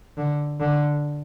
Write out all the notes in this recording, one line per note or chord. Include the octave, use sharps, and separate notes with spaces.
D3
D3